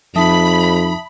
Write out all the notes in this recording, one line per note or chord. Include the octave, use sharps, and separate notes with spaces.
F2 F3 D#4 E5 A5 B5 D#6